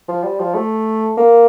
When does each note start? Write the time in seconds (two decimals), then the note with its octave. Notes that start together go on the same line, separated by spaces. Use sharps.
0.08 F3
0.23 G3
0.39 F3
0.54 A3
1.17 A#3